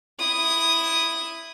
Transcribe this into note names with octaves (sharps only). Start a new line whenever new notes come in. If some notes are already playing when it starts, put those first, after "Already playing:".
E4 D#6